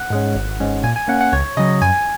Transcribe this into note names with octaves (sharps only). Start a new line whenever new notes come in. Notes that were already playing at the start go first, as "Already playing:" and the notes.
Already playing: F#5
G#2 G#3 C#4
G#1
G#2 G#3 C#4
A#2 G#5
G#5
A#3 C#4 F#5
F#5
C#2 C#5
C#3 F#3 D#5
F#2 G#5